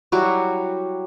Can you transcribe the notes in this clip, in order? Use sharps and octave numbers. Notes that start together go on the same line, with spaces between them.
F#3 G3 E4 F#4